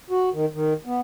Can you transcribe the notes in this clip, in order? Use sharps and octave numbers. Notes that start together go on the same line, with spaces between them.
F#4
D#3
D#3
B3